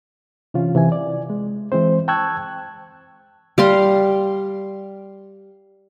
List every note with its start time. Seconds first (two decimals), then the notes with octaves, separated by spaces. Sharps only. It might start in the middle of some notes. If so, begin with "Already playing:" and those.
0.54 C3 E3 C#4 F4
0.75 C3 E3 F4 G#5
0.92 D5
1.30 G#3
1.72 E3 G#3 C4 C5
2.08 G5 A5 C#6 E6 F#6 G#6
3.58 G3 F5 C6